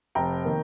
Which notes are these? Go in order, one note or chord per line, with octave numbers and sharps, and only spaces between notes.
F1 G5 A#5
D#3 A#3